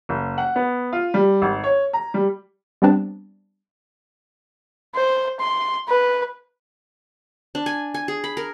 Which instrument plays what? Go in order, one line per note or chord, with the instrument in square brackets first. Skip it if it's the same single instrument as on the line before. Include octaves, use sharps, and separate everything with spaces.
[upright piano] F#1
F#5
B3
F4
G3
G#1
C#5
A#5
G3
[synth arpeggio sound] G3 B3 C4 D4
[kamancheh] C5
C6
B4
[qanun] D4
G#5
G#5
G#4
B5
A#4